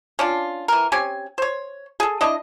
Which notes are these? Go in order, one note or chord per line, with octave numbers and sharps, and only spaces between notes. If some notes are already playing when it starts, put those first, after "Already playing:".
C#4 D4 F4
E3 A#4
C4 C#4 G4 G#5
C5 C#5
G#4 A4
D4 E4 D#5